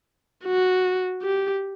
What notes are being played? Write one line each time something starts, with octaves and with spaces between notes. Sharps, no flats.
F#4
G4